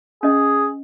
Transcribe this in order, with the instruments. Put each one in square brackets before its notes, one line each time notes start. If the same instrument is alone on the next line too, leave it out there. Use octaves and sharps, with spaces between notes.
[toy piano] C#4 D#5 [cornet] G#4